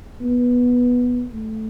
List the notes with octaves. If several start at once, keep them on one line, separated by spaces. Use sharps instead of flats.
B3
A3